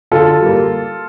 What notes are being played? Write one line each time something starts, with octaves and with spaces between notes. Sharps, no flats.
D3 F4 A4
G3 A#3